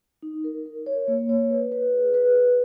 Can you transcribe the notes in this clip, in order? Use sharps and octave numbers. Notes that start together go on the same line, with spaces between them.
D#4
A#4
A#4
C#5
A#3
C#5
B4
B4
G#4
B4
B4